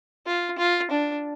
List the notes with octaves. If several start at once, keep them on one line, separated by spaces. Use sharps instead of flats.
F4
F4
D4